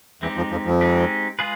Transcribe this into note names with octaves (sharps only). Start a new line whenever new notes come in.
E2 E3 G#3 C4 D#4 G4
F2 F3
F2 F3
F2 F3
G#3 C4 D#4 G4
G#3 F4 G#4 B4